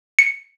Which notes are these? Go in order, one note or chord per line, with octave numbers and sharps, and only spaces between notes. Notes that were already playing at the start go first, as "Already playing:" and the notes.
C#7